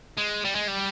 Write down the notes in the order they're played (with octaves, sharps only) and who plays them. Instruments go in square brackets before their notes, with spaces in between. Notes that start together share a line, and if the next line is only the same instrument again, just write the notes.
[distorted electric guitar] G#3
G3
G#3
G3